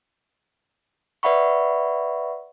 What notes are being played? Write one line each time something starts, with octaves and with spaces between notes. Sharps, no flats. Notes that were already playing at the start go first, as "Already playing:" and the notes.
B4 D5 E5 F#5 B5 C#6